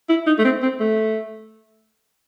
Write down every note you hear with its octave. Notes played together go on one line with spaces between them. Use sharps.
E4
D#4
A3
C4
C4
A3